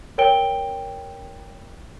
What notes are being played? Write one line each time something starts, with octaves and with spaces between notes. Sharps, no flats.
A#4 C#5 G5 D7 G7